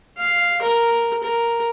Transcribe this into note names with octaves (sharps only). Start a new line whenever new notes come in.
F5
A#4
A#4